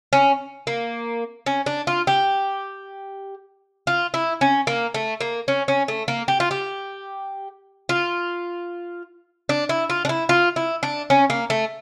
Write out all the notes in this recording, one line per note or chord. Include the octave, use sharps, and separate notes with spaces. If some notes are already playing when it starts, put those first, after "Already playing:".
C#4
A#3
C#4
D4
F4
G4
F4
E4
C#4
A#3
A3
A#3
C#4
C#4
A3
A#3
G4
F4
G4
F4
D4
E4
F4
D4
E4
F4
E4
D4
C#4
A#3
A3